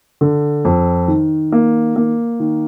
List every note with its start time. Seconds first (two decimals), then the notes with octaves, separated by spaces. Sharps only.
0.21 D3
0.65 F2
1.08 D#3
1.52 A#3
1.96 A#3
2.40 D#3